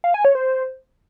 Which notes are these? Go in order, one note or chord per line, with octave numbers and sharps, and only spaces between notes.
F5
G#5
C#5
C5